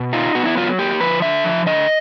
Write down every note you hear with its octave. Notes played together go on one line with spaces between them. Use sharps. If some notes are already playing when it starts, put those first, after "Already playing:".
Already playing: B2
D#4 F4
B3 F#4
E4
F#3 F4
A#3 G4
F3 B4
D3 E5
F3
D3 D#5